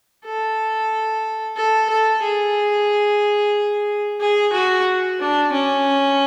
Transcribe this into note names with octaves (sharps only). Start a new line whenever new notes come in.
A4
A4
A4
G#4
G#4
F#4
D4
C#4